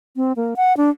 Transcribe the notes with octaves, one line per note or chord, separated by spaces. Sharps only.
C4
A#3
F#5
D4